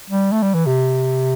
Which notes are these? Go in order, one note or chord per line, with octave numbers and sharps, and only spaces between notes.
G3
A3
G3
E3
C3